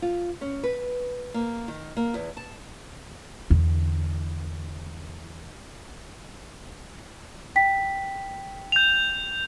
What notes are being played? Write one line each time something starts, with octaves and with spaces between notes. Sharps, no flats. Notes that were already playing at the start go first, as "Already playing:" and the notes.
F4
C#4
B4
A#3
D#3
A#3
E2
A5
E2 D3
G5 B6
G6 F7